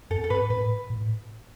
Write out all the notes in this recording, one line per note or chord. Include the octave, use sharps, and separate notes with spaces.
F#2 A4
A4
G#2 B4
A2 B4
A2